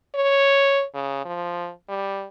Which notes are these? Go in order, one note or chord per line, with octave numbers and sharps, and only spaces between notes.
C#5
C#3
F3
G3